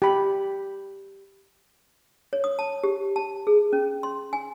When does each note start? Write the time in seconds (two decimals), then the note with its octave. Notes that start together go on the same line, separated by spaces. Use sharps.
0.02 G4 B5
2.33 C#5
2.44 D#6
2.59 A5
2.84 G4
3.16 A5
3.47 G#4
3.73 C#4
4.03 C6
4.33 G#5